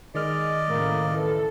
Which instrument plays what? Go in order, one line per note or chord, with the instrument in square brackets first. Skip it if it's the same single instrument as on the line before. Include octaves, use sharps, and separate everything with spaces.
[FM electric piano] D#3 F6 [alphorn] G#3 [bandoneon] D5 D#5
[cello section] A2 C#3 A3 [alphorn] A#3
[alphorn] E3 [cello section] A4